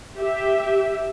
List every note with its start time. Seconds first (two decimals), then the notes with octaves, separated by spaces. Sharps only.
0.18 G4 E5